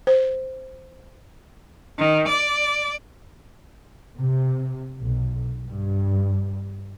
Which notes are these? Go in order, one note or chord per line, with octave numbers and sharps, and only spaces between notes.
C5
D#3
D5
C3
B1
G2